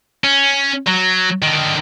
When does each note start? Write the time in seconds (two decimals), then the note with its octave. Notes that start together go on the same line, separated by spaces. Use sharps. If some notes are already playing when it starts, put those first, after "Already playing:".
0.24 C#4
0.87 F#3
1.42 D3 D#3